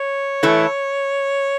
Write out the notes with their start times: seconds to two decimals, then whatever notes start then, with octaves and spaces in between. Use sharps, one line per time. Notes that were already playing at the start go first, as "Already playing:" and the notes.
Already playing: C#5
0.43 E3 A3 E4